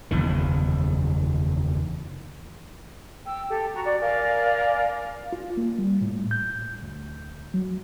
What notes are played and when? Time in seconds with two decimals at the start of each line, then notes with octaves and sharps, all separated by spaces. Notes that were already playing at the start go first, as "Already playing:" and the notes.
0.11 F#1 E2 D#3
3.26 G5 E6
3.49 G4 A4
3.73 F#4 A#5
3.85 F#4 D5
4.01 A#4 D5 F5 G#5
5.32 F4
5.57 A#3
5.78 G3
6.01 A2
6.31 G6
6.83 D2
7.54 F#3